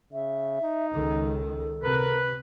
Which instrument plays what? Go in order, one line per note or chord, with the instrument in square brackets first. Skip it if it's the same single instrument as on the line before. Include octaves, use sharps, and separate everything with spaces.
[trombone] C#3 [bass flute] E5
[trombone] D#4
[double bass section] C#2 D#3 [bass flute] A4
[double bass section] C3 [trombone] A#4 [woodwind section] B4